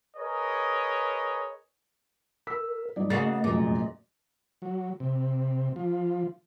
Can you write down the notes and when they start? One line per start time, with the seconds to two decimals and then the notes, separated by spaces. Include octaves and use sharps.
0.17 G#4 A#4 B4 C#5 D#5
2.47 A#4 E6 B6
2.96 G2 F#3 D#4 D5 D#5
3.10 C#3 A3 A#3 F#4 D#5 A6
3.44 F1 F#2 A#2 G#3
4.62 F#3
5.00 C3
5.76 F3